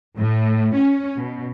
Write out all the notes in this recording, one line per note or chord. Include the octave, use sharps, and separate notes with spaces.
A2
C#4
B2